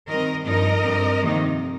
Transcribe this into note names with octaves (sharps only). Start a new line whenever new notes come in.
D#3 G3 C4 A#4 D#5
G2 F3 D#4 A#4 D#5
G2 G3 C4
F2 C3 D#3 A#3 D#4